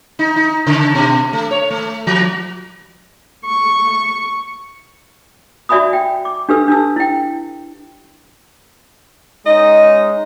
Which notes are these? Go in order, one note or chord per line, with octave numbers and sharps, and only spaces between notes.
D#4
D#4
C#3
B2
A3
C#5
A3
F3
C#6
F#4 D5 E5 G#5 B5 D#6
G5
D6
D4 G4 A4 B4 E6
D4 A5 E6
E4 G5
G#3 C#4 D#4 D#5